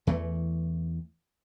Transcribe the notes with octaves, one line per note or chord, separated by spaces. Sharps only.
E2 E3 A3